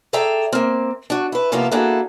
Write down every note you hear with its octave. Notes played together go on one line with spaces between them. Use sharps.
G#4 A4 D5 E5 G5 A#5
A#3 C4
D4 F#4
E4 B4
C3 F3 A#3 B3 E4 F4
A#3 D4 E4 F#4 G#4 A4